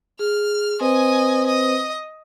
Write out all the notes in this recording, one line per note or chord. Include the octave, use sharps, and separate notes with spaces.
G#4 F6
C4 B4 C5 D#5 G#5
D#5